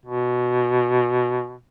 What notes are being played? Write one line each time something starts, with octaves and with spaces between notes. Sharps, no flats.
B2